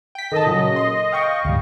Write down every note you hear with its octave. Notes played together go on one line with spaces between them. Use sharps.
G5 B6
D#3 A4 A#4 D#5 A5 D#6
A#2 C#3 F#3
C6
F5 G5 C#6
D2 G#2 G3